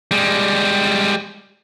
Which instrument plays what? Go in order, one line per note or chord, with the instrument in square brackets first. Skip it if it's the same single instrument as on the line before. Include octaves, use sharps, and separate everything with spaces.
[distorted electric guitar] G3 G#3